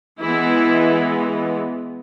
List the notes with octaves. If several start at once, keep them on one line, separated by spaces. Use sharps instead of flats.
E3 G#3 B3 E4